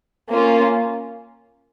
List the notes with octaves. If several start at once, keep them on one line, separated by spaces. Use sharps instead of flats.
A#3 C#4 F4